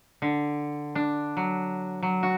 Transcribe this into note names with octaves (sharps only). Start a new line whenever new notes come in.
D3
D4
F#3
F#3
F#4